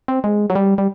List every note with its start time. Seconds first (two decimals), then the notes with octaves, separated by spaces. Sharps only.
0.08 C4
0.24 G#3
0.50 F#3
0.55 G3
0.78 G3